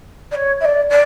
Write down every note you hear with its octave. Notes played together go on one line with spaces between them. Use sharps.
D5
C#5
E5
D5
D5